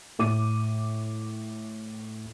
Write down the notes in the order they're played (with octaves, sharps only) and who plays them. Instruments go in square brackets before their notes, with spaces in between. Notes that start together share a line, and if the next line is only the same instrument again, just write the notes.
[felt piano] A2 D6 D#7